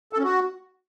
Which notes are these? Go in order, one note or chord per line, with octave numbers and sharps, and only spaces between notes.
A4
C#4
F#4